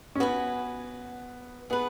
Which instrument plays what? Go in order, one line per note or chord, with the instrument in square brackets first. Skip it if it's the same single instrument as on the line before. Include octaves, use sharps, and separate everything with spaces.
[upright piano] C#4
[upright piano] B3 [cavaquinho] F#4 B4 G#5
[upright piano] B3 [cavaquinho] G#4 B4